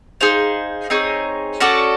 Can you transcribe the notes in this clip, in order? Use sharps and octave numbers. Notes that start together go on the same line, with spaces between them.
D#4 G#4 C5 F5
C4 D#4 G#4 C#5
C#4 F#4 A4 D5